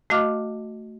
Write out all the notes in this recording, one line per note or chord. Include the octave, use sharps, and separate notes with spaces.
A3 F#4 D#5 F5 D6 F6